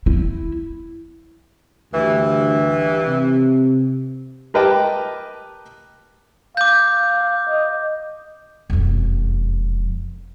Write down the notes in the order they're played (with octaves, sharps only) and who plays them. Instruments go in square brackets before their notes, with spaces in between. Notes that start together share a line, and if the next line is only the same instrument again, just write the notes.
[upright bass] E4
[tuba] D2 [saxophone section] G2 E3
[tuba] C3
[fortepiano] G4 A#4 B4 D#5 G5 A5
[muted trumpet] F5 [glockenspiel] D6 G6
[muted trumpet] D#5
[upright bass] E1 F2